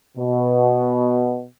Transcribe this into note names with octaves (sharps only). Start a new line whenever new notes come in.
B2